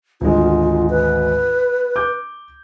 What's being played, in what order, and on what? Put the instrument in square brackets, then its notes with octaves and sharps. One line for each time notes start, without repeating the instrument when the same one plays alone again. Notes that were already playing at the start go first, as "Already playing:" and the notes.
[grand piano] G#1 D2 G#3 [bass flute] F4
[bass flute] B4
[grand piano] D6 G6